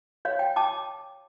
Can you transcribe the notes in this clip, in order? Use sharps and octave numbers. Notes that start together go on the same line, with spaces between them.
C#5 F5
G5
G5 A5 D6